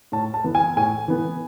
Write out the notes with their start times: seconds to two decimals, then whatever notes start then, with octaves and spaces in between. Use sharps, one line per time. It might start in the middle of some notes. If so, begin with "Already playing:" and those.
0.12 A2 A5
0.34 A5
0.44 E3 B3
0.55 G#5
0.76 A2 G#5
1.08 E3 B3